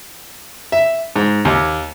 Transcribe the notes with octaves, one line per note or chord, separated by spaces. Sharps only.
E5
G#2
D#2